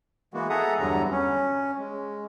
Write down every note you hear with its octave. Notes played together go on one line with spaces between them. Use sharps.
E3 G#3 A#3 B3 F#4
G#4 A4 E5 F#5 A#5 D#6
E2 G2 D3 F#3 G3 A#5
C#4
G#3